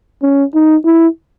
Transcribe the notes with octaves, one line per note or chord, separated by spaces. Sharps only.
C#4
D#4
E4